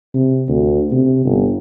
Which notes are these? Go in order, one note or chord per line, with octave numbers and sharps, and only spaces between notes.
C3
D2
C3
G1